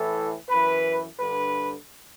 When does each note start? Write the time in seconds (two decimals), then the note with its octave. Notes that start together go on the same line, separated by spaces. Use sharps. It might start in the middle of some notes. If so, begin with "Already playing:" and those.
Already playing: A2 E3 A4
0.50 F#2 E3 B4
1.19 G2 D3 B4